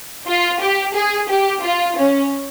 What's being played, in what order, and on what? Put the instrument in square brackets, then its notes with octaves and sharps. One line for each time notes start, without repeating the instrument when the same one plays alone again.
[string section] F4
G4
G#4
G4
F4
C#4